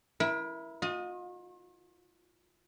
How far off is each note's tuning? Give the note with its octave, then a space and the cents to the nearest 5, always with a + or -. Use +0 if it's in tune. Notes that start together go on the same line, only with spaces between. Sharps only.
E4 +0 A#4 +35
F4 +45 D#5 +0